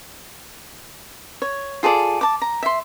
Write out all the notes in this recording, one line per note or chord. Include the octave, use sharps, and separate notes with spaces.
C#5
F4 G#4 A4 D5
A5 D6
A#5
E5 C6